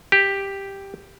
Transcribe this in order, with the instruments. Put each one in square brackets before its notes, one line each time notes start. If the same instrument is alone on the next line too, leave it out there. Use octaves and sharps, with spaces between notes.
[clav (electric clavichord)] G4